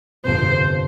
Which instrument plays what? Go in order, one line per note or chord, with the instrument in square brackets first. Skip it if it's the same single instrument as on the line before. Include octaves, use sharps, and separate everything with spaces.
[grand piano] G1 F2 C3 [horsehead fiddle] C5